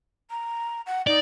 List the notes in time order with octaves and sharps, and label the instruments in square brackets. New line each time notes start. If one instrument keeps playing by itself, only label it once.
[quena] A#5
F#5
[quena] D#4 [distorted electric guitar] D5